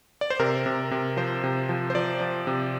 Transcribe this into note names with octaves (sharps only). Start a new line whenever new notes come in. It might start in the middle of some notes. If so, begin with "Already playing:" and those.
D5
C5
C3 A#4
C3
C3
F3 C5
C3
F3
C5
F3 D5
F3
C3